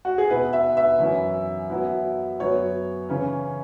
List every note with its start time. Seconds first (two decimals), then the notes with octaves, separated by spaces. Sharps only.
0.05 F#4
0.18 G#4
0.29 B2 B3 E4 B4
0.53 E5
0.77 E5
0.99 F#2 E3 C#4 E4
1.70 F#2 F#3 B3 E4
2.39 F#2 F#3 B3 C#5
3.09 C#3 E3 C#4